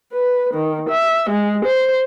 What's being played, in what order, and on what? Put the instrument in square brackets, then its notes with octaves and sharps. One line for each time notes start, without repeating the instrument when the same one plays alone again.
[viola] B4
D#3
E5
G#3
C5